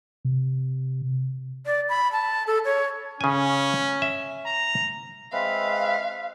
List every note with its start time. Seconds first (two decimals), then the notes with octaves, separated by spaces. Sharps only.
0.25 C3
1.66 D5
1.89 B5
2.12 A5
2.47 A4
2.65 C#5
3.21 C#3 C#4 G#5
4.02 E5
4.46 A#5
5.32 G#3 C4 B4 E5 F5